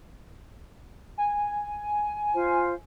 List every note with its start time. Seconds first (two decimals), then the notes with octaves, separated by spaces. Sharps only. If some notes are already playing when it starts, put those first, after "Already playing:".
1.18 G#5
2.32 F4 C5